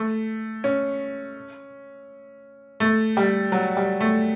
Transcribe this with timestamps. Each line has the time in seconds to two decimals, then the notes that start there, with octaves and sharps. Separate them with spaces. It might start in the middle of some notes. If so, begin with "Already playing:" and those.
Already playing: A3
0.64 C#4
2.80 A3
3.17 G3
3.52 F#3
3.77 G3
4.01 A3